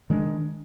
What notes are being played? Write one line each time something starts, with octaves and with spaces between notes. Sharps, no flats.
D#3 G#3 D4